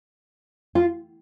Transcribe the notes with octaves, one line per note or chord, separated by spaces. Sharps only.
F4